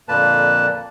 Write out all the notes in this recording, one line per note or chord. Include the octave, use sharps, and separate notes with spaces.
F2 A#2 D3 A#3 B4 A5